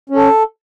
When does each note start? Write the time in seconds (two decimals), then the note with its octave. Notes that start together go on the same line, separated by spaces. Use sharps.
0.10 C#4
0.16 A4